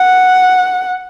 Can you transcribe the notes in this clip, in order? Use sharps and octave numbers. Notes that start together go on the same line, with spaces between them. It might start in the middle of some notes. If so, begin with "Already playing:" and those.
Already playing: F#5